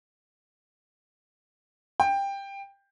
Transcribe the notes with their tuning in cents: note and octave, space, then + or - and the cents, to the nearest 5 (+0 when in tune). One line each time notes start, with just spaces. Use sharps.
G5 +15